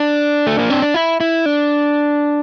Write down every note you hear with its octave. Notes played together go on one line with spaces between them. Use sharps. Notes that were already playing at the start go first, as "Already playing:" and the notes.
Already playing: D4
A3
A#3
C4
D4
E4
E4
D4